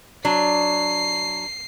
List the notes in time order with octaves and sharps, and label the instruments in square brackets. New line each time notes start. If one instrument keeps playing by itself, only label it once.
[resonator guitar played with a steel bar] F#3 D4 [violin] C7